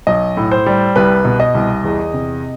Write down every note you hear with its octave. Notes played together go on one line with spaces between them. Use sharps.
B1 D#5
A2
C5
G3
C2 B4
B2
D#5
C2
E2
C3